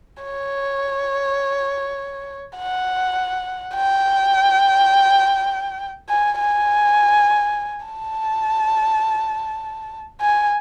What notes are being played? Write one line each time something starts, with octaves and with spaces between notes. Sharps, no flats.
C#5
F#5
G5
G#5
G#5
A5
G#5